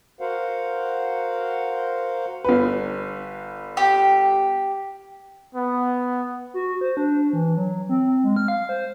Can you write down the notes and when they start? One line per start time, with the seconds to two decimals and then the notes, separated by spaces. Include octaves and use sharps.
0.21 F#4 A#4 C5 F5 F#5
2.44 G1 B4
3.77 G4
5.55 B3
6.54 F#4
6.81 C5
6.97 D4
7.33 E3
7.57 F#3
7.89 C4
8.24 G#3
8.36 F6
8.48 F5
8.69 C5